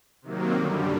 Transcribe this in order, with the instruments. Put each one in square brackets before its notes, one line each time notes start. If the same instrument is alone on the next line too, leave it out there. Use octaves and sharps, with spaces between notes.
[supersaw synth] C3 D#3 F#3 A#3
F#2 D3 G3